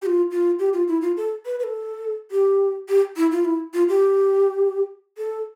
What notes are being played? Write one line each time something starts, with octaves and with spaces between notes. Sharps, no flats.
G4
F4
F4
G4
F4
E4
F4
A4
B4
B4
A4
G4
G4
E4
F4
E4
F4
G4
A4